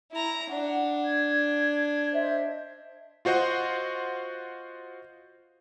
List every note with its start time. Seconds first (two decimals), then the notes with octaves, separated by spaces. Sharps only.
0.12 E4 A#5
0.49 D4 F#5
1.04 G#6
2.14 C5 D#5 E5
3.25 F4 F#4 C5 D#5 F#5